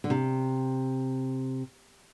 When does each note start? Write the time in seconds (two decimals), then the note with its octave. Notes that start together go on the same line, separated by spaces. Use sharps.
0.04 D3
0.10 C3